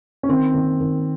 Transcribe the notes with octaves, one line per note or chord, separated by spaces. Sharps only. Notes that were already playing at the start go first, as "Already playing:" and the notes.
C#4
D#3 C4
D#3
D#3